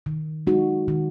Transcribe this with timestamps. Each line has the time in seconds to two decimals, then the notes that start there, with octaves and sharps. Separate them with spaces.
0.06 D#3
0.47 G#3 D#4 F#4
0.88 D#3